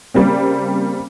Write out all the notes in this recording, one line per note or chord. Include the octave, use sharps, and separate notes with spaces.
C#3 G3 A#3 C4